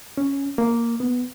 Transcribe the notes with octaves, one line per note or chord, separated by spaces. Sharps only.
C#4
A#3
B3